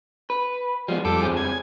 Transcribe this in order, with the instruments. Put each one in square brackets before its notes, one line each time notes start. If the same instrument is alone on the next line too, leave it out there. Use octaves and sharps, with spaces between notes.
[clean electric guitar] B4
[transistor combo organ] F3 [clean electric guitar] G3 G#3 B3
[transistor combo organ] F2 G3 D6 [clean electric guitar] A4
[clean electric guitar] C#2 C4 G#4
[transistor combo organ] G#5